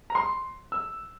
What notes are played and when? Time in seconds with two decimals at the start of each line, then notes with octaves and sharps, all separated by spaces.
0.10 A#5
0.15 C6
0.72 E6